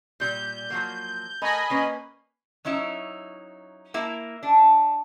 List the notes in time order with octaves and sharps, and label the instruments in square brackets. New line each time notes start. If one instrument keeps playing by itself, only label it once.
[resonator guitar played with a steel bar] A#2 G3 [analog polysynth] G6
[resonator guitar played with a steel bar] F3 F#3 A#3
[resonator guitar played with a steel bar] A3 A#4 [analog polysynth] D#5 G#5 B5
[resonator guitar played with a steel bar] A#3 C#4 B4
F#3 C#4 D#4 E4
A#3 E4
D4